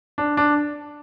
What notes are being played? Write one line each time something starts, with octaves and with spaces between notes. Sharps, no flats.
D4
D4